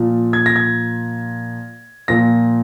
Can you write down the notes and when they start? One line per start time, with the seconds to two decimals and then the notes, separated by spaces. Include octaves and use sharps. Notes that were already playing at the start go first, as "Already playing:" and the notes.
Already playing: A#2 F3
0.33 G#6
0.46 A#6
0.56 G#6
2.08 A#2 F3 A#6